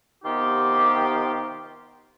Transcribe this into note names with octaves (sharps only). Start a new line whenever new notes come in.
C3 D#3 B3 D#4 F4 G4